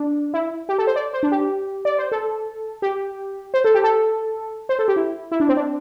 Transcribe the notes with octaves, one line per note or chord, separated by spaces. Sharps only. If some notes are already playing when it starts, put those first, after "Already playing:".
Already playing: D4
E4
G4
A4
C5
D5
C5
D4
G4
D5
C5
A4
G4
C5
A4
G4
A4
C5
A4
G4
E4
E4
D4
C4
D4